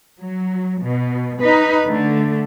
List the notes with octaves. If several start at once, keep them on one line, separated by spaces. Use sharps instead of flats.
F#3
B2
D#4 B4
D3 A3